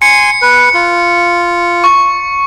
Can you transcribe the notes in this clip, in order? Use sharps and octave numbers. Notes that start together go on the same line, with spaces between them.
G#5 C6 C#7
B4
F4
C#6